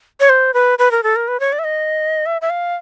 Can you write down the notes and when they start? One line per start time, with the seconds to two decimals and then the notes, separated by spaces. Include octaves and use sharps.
0.20 C#5
0.29 C5
0.54 B4
0.79 B4
0.91 A#4
1.03 A4
1.16 A#4
1.28 B4
1.40 C#5
1.53 D5
1.59 E5
1.64 D#5
2.26 E5
2.42 E5
2.50 F5